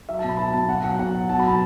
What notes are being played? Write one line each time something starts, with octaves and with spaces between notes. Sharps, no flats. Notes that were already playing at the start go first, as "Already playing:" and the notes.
F#3 E5
A5
B2
B5
F#3 A5
B2 A5
B2 F#5
F#3 F#5
B2 F#5
F#3
F#3 A5
B5
B2
A5